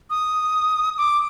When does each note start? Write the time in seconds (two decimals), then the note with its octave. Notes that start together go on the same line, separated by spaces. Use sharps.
0.10 D#6
0.97 D6